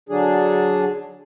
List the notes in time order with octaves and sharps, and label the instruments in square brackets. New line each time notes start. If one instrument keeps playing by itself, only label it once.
[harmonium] D3 F#3 D4 G#4